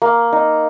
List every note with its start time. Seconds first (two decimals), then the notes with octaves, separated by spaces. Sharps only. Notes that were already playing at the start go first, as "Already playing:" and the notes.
0.02 A#3
0.33 D#4